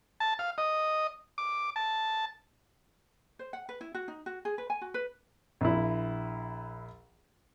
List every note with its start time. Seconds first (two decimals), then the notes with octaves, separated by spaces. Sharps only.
0.20 A5
0.39 F5
0.58 D#5
1.38 D6
1.76 A5
3.39 C5
3.53 F#5
3.69 B4
3.81 E4
3.95 F#4
4.08 D#4
4.26 F#4
4.45 G#4
4.58 B4
4.70 G#5
4.81 F#4
4.94 B4
5.61 A#1 E4